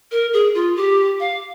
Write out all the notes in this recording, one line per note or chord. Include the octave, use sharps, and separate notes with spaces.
A#4
G#4
F4
G4
F5